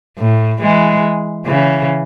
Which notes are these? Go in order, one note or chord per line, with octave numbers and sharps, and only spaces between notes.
A2
E3 G#3
C#3 E3